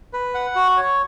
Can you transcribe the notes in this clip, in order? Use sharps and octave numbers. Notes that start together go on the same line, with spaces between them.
B4
F#5
F#4
C#5